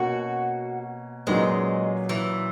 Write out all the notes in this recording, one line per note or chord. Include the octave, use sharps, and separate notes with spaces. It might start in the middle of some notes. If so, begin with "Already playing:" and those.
Already playing: B2 A#3 C#4 F#4
A#2 F#3 G#3 C#4 G#4 B4
E3